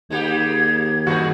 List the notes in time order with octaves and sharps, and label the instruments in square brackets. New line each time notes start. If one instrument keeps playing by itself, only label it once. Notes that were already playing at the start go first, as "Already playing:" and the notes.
[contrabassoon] D#2 [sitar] G#3 A#3 G4 [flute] G#6
[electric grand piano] G2 F#4 [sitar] D#3 D#4 G#4